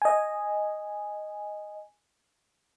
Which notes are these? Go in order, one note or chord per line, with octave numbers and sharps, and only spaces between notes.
D#5 G#5